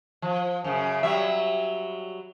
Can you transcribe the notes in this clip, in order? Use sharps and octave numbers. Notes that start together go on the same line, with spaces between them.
F3
F#2 C#3
F#3 G3 E5